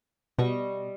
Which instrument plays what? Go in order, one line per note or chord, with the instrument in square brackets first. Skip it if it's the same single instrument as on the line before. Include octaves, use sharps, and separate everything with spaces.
[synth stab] B2 [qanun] G3 D#5 C#6